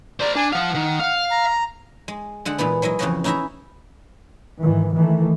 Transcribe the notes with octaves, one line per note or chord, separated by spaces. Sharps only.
A#4 C5 D5
D4 G#5
F3 F5 F#5
D#3
F5
A#5
G#3
D3 G#3 F#5
A#2 E3 G#3 B3
F#3 G#3 E4 D#5
F2 C#3 E3 F#4 C#5 D#5
C#4 D#4 E4 F#4 E5 A#5
G#2 D#3 E3
D#3 E3 A3